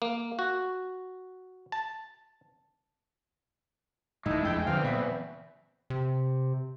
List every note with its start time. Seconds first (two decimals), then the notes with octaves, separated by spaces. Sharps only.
0.02 A#3
0.39 F#4
1.72 A5
4.26 D#1 G#2 G#3 A3 D#4 E4
4.44 E2 F3 D4 G5
4.67 E2 D3 E3 F3 C4 F5
4.84 A#2 C#3 F#3 B3 E5
5.90 C3